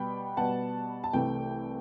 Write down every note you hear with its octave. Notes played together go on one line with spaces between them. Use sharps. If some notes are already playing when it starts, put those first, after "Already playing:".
Already playing: B2 G3 B3 G5 B5
B2 G3 B3 F#5 A5
A5
C2 C3 E3 A3 G5